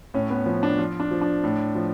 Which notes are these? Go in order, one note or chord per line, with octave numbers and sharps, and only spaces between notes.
A2 C#4
B3
F3 C#4
D4
F3 F4
D4
F3
D4
A2
F3